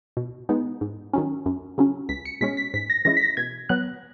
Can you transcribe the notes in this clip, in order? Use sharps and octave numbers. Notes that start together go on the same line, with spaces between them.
B2
G#3 B3 D#4
G#2
D#3 F#3 C#4
F#2
C#3 F#3 C#4
C#2 B6
C#7
B2 G#3 C#4 B6
B6
G#2 B6
A#6
E3 G#3 C#4 E4 A#6
B6
A#6
B2 G#6
F#3 B3 F#6